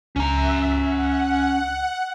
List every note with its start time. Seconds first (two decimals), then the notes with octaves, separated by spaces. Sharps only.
0.16 C#2 C#4 E5 A#5
0.76 F#5